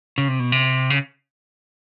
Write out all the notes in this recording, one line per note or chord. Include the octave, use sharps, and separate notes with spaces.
C#3
C3
B2
C3
C#3